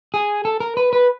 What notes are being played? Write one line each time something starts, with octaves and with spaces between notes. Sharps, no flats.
G#4
A4
A#4
B4
B4